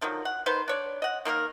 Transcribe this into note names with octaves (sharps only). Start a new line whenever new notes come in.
D3 D#3 F3 F#3
F#5
D#3 D#4 B4 C5
D4 C#5 D5
D#5 F#5
D#3 A#3 G4 A#4